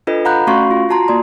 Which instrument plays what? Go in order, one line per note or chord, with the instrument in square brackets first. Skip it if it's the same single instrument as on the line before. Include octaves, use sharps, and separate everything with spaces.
[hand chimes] D4 F4 A4 B4 D#5
F5 F#5 A#5 B5 F#6 G6
A3 C#4 F#4 F5 C6 C#6
F4
F4 F#4 A5 A#5 C6
A#3 D5 C6